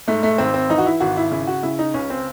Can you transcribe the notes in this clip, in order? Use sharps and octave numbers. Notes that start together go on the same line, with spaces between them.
G#2 A3
A3
G#1 C4
C4
E3 D#4
F#4
E4
G#1 F#4
E4
C#3 E4
F#4
C#3 E4
D#4
C#2 C#4
C4